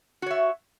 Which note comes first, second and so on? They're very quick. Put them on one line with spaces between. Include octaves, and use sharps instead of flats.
F#4 C#5 E5